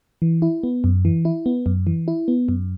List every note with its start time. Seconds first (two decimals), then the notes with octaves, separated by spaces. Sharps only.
0.22 E3
0.42 E4
0.63 B3
0.84 F#2
1.05 E3
1.25 E4
1.46 B3
1.66 F#2
1.87 E3
2.08 E4
2.28 B3
2.49 F#2